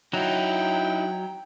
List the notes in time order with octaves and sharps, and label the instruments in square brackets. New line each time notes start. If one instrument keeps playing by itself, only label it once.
[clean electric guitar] F#3 [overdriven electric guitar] D#4 E4 [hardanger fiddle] G5